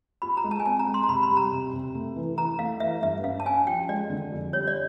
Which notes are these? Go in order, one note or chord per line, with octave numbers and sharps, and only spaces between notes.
F4 B5
A#5
G#3
A5
G#5
C4 A5
A#5
G#3
C6
A#5
C3 B5
B5
G3
A#5
C3
C3
A3
E3
E3 A#5
A3 F5
E3 E5
G2 E5
C#4 F5
A5
C#4 G#5
F3 G5
G#3 D5
D3
F2
G3 C#5
D5